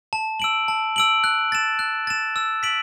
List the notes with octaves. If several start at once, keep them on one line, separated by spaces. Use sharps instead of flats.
A5
E6 D7 F#7
A5
E6 D7 F#7
F#6
A6 E7
F#6
A6 E7
E6
B6 D7 F#7